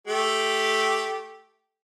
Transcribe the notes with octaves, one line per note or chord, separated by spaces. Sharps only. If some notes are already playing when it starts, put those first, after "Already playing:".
A3 G4